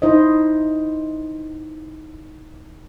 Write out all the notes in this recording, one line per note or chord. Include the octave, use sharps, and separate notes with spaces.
D#4 E4 C5 D#5